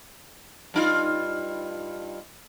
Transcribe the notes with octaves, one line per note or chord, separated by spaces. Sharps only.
G2 D#4 F4